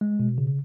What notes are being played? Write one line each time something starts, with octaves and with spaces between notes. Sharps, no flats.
G#3
B2
C#3